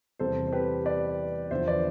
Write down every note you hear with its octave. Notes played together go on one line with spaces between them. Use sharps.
E2 C3 E3 G3 A4 C5
C5
G4 B4
B4 D5
E2 D3 F3 C5 E5
B4 D5